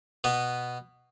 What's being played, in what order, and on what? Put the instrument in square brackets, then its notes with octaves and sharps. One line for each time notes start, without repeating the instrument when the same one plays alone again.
[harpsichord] B2 B3